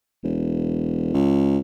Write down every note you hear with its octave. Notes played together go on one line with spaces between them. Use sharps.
E1
C#2